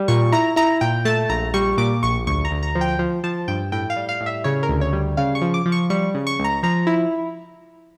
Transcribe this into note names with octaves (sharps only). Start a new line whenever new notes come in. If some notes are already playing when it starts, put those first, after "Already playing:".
Already playing: G3
A#2 C#6
E4 A#5
E4 A#5
A#2 G5
A3 A5
A#1 A#5
G3 C#6
A#2 D6
A#1 C#6
D2 C#6
A#5
D2
A#5
F3
G5
F3
F3 A5
G2 G5
A2 G5
F5
G3
F5
A2
E5
C#3 C#5
A#4
D2
C#5
G3
C#3 F5
C#6
F3
D6
F3
C#6
G3 C#6
C#3
C#6
C#2
A#5
F3 A#5
E4